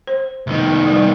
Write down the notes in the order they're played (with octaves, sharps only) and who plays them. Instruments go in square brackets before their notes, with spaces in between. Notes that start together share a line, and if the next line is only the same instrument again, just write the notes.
[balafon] C5
[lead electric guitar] C2 D#3
[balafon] G3